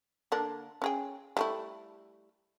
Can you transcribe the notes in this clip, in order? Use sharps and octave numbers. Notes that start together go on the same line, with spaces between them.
D3 A#3 D4
C#4 G#4 G5
G3 A3 E4